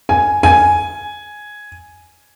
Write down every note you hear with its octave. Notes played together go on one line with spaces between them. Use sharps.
G#5
G#5